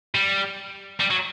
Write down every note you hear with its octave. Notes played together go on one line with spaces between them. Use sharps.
G3
G3
F#3